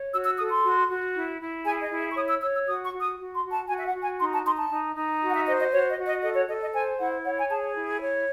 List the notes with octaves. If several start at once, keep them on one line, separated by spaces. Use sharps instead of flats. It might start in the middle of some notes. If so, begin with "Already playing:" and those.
Already playing: C#5
F#4 E6
E6
A4 D#6
C6
F#4
F#4
E4
E4
G#4 G#5
D#5
E4
E5
C#6
C#5 D#6
E6
C#5 E6
E6
F#4 D#6
C#6
F#4
D#6
F#4
C6
F#4
A5
F#4 G#5
E5
F#5
F#4
G#5
D#4 C6
A5
D#4 C6
A5
D#4
D#4
F#4
F#5
E5
C5 D#5
D#5
F#4 C#5
D#5
F#4
D#5
A4 D#5
C#5
A4 D#5
D#5
C5 G#5
E4 F#5
C#5 F#5
G#5
G#4 A5
E4
C#5